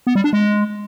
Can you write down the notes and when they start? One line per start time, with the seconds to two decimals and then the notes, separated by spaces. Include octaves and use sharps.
0.07 B3
0.15 G3
0.24 D4
0.33 G#3